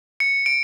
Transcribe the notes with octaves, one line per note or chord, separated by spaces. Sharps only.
C#7
D7